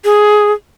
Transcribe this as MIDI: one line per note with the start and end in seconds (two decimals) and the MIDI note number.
0.05 0.52 68